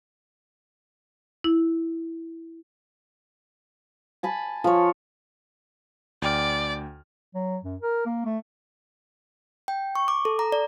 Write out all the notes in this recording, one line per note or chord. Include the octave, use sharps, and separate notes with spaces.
E4
G#5 A5 B5
F3 C#5
D2 D5 G5 F6
F#3
F#2
A#4
A#3
A3
G5
C#6
D6
A4
A#5
D5